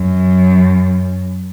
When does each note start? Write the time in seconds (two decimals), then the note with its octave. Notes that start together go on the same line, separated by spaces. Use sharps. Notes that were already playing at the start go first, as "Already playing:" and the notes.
Already playing: F#2